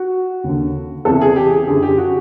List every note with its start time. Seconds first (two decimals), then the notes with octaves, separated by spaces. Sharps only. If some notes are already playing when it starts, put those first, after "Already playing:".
Already playing: F#4
0.44 D#2 D3
1.05 E2 C3 E3 A4
1.21 G#4
1.36 G4
1.52 G#4
1.68 F#2 D3 G#4
1.83 G4
1.98 F#4